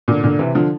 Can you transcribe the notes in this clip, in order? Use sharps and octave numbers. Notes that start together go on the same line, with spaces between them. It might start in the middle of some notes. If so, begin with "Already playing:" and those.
A#2 D3
A#2 D3
C3 E3
D3 F3